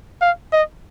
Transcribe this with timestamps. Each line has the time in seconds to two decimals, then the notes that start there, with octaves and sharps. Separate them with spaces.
0.21 F5
0.53 D#5